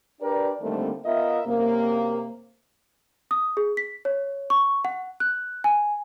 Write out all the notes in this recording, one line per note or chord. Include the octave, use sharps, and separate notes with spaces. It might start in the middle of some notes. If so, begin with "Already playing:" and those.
D4 G4 A#4 B4 D5
D3 D#3 G3 A3 A#3 C4
B3 F4 A#4 D#5 E5
F#2 C3 A#3
D#6
G#4
B6
C#5
C#6
F#5
F#6
G#5